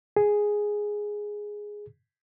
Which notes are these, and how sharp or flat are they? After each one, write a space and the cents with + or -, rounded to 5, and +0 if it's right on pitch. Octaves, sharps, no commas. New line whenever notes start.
G#4 +0